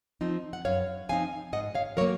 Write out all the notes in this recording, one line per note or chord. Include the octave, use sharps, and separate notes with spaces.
F3 C4 D#4
F#5
F#2 C#5 F5
F3 C4 D#4 F5 G#5
G#2 D#5 F#5
C#5 F5
F#3 A#3 A#4 C#5